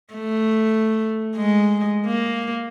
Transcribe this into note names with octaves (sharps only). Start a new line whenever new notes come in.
A3
G#3
A#3